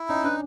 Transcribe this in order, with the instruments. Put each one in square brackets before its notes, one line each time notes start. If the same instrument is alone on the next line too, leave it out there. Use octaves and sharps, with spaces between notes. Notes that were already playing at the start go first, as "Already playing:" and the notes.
Already playing: [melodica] E4
[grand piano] C#4 [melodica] D#4
[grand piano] D4 [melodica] B4